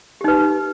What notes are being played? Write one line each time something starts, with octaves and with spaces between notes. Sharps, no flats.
D#4 G4 B4